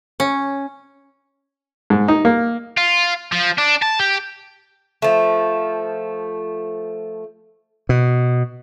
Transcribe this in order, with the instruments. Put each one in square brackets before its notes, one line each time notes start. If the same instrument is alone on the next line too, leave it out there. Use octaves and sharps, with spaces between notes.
[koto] C#4
[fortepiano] G#2
D#4
A#3
[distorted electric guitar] F4
F3
D4
A5
G4
[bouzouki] F3 A3
[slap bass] B2